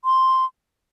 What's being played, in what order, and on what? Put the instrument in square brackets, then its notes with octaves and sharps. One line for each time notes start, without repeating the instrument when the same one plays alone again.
[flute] C6